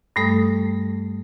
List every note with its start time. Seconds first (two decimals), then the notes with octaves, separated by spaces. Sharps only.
0.16 G2 G3 A3 A4 D#6